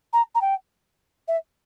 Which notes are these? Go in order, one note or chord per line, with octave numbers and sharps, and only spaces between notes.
A#5
A#5
G5
E5